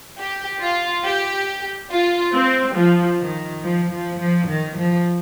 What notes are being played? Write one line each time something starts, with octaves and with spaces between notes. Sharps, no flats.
G4
F4
G4
F4
C4
F3
D#3
F3
F3
F3
D#3
F3